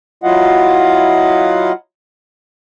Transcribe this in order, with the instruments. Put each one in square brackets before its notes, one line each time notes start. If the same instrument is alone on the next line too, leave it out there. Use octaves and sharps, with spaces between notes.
[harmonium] F#3 E4 F4 D#5 F5 F#5